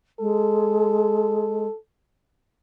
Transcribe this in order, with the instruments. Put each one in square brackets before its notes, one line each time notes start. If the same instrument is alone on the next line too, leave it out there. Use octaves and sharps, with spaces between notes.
[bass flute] G#3 [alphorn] A4